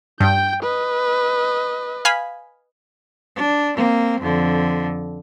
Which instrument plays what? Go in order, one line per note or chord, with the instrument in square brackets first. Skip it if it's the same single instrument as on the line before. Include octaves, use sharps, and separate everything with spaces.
[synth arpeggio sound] G2 [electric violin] G5 G6
[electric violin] B4 D#5
[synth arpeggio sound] F5 G#5 B5
[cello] D4
A#3 C4
F2 D3